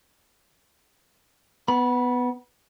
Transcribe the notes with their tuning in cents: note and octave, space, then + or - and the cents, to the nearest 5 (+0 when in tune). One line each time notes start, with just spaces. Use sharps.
B3 +10 B5 -25